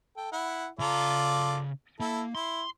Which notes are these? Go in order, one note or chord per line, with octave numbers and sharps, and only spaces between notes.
A4 G5
E4 F#5
C#3 F4 A4 D5 A#5
A#3 E4 A4
E4 C6